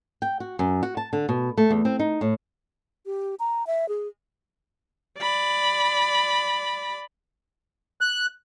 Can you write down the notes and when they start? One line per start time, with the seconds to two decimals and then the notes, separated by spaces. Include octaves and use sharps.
0.22 G5
0.40 F#4
0.59 F#2
0.83 F#4
0.97 A5
1.13 D3
1.29 B2
1.58 A3
1.71 E2
1.85 C4
1.99 D#4
2.21 A2
3.05 G4
3.40 A#5
3.67 E5
3.89 G#4
5.19 D5 B5
8.01 F#6